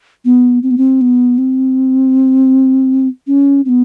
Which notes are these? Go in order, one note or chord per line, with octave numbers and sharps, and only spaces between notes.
B3
C4
B3
C4
B3
C4
C#4
C4
B3